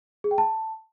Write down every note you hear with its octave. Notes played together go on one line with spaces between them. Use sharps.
G#4
G5
A5